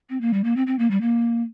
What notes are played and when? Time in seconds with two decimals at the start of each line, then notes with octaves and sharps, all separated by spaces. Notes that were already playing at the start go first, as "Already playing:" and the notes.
0.09 C4
0.21 A#3
0.33 G3
0.44 A#3
0.56 C4
0.67 C4
0.79 A#3
0.90 G3
1.01 A#3